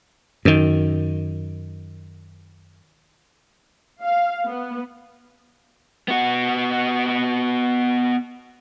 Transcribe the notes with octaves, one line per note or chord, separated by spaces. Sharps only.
F#2 D#3
F5
B3
B3 F#4